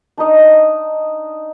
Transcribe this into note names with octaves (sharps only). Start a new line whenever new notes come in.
D4 D#4 D#5